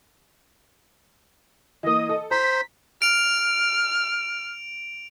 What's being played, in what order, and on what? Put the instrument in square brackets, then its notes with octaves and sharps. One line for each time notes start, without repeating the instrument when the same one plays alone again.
[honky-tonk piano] E3 A#3 [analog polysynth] D#5 D#6
[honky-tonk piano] A4
[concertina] C5 [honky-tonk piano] A#5 [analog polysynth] B6
[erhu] F6 [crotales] D7 F7